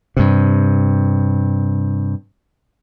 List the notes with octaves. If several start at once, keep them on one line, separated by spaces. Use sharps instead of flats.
G2 C3